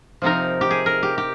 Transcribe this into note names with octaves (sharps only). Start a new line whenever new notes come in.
C3 F3 C4 D#4 A#4
G4
G#4
A#4
G4
G4